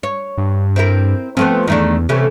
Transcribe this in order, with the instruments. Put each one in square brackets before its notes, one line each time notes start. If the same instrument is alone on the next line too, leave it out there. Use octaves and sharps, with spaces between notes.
[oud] C#5
[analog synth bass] G2
[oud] C4 E4 A#4
[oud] F3 A3 B3 [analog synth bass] C4
[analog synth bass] E2 [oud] D#3 A3 D4
[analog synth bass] C3 [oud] E3 A3 C#4